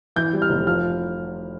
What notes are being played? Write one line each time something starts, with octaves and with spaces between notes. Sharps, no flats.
E3 G6
G3
F6
F1
F3 F6